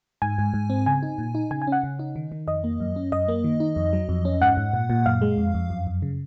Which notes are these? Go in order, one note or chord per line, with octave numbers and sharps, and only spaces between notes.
G#2 G#5
G#2
G#2
C4
C#3 G#5
D#4
A#2
D#4
C#3 G#5
G#5
C#4
F#5
C#3
D#4
D#3
D#3
F2 D#5
A#3
F#2
C#4
F#2 D#5
A#3
D#3
D#4
F2
F#3
F2
C#4
G#2 F#5
G#2
A#2
A#2
F#2 F5
G#3
F2
F2
F#2
F#2
C#3